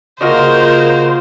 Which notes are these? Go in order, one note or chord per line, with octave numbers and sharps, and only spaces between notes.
C#3 A#3 F4 F#4 C5 D#5